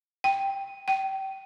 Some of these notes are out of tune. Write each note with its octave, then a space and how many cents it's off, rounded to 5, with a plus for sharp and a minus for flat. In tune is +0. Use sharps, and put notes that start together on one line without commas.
G5 +5
G5 -25